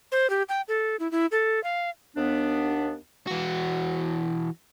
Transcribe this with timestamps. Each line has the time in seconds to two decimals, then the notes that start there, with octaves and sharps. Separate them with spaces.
0.12 C5
0.30 G4
0.49 G5
0.68 A4
1.00 E4
1.12 E4
1.32 A4
1.64 F5
2.16 D#2 B3 D4
3.27 E3 F#4